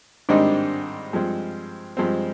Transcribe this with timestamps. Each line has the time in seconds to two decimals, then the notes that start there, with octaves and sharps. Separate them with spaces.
0.29 G#2 D#3 G3 C4 D4 D#4
1.13 G2 F3 G#3 C4
1.97 G2 F3 G#3 C4